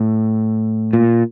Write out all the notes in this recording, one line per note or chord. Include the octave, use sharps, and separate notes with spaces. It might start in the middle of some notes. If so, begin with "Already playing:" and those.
Already playing: A2
A#2